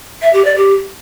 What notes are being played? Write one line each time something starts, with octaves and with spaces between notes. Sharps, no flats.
E5
G4
D5
G4